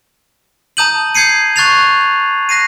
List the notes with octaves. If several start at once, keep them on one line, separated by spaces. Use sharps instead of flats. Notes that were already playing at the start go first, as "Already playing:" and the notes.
A5 A#5 D#6 G6 D#7 F#7
D#6 G6 G#6 C7 C#7 D#7
C#6 F#6 G#6 A6 C7 F7
F#6 A#6 C7 D#7